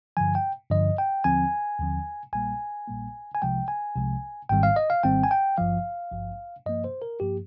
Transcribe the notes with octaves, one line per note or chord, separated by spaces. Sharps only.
G2 D3 F3 G#5
G5
G2 D3 F3 D#5
G5
D#2 D3 F3 C4 G#5
D#2 D3 F3 C4
A#1 A#2 G3 A#3 G#5
A#1 A#2 G3 A#3
G#5
C2 C3 F3 G#3 G5
G#5
C2 C3 F3 G#3
G#1 G#2 D#3 G3 C4 G5
F5
D#5
F5
G#1 G#2 D#3 G3 C4 G5
G#5
G5
G#1 G2 F3 F5
G#1 G2 F3
G2 F3 A#3 D#5
C5
A#4
G2 F3 A#3 G4